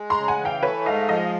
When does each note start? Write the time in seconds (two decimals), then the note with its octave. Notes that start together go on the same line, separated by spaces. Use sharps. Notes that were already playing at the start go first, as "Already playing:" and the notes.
Already playing: G#3
0.10 A#5 C6
0.17 C#3
0.28 F#5 G#5
0.39 E3
0.45 F5 G5
0.62 A3 B4 C#5
0.86 G#2 D#5 F5
1.09 F3 D#5 F5